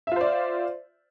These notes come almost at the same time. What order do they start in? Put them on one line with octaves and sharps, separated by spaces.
E5 F4 C5 D5